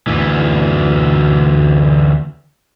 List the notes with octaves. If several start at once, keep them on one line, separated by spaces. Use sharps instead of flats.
D2 E3